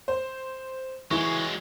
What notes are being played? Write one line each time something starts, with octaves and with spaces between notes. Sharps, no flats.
C5
E3 F#3 G#3 E4 C#6